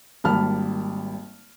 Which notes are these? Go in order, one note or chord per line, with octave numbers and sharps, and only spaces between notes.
G#1 G3 A#3 A5 B5 F6